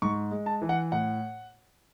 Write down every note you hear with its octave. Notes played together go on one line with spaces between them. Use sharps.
G#2 C#6
G#3
A5
E3
F#5
A2 F#5